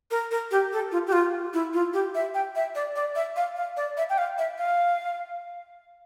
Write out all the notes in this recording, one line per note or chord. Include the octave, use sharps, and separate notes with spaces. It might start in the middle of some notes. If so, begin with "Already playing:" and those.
A#4
A#4
G4
A4
F4
G4
F4
E4
F4
G4
E5
G5
E5
D5
D5
E5
F5
F5
D5
E5
G5
F5
E5
F5